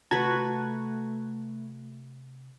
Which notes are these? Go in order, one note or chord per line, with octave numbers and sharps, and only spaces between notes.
C3 A3 F#4 B4 A5 A#5 G#6